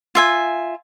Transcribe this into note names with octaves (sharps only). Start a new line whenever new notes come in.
F4 E5 G#5